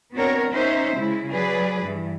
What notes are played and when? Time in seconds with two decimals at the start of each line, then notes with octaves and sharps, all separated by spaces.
0.16 B3 C4 D4 F#4 A#4 C#5
0.50 C#4 D#4 C5 E5
0.96 C#3 G#3 E4
1.31 F#3 G#4 B4 D5
1.83 G2 E3